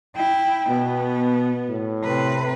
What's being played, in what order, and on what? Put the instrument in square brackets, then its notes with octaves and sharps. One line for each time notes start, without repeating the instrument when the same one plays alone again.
[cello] E4 G5
[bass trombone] B2 [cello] B3
[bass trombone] A2
[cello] C3 B4